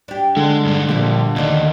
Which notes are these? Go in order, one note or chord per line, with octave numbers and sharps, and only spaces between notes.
D4 G4
D3 G#3
G2 G#3
A#2 F3 G3 A#3
D2 D#3 D#4 D5